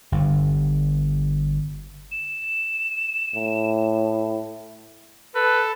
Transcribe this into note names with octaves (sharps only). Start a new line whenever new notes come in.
G1 G2
E7
A2
A4 B4